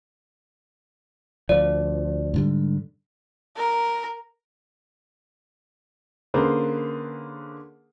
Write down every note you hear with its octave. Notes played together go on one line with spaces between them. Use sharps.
D2 F3 D5
G#2 D3 G3
A#4
D3 A#3 C#4 G#4 B4 C5